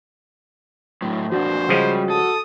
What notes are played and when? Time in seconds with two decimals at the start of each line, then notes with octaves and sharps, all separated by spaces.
1.02 A2 F#3
1.32 F2 D4 F#4 C5
1.69 C#3 F3 G3 G#3
2.10 A4 D#6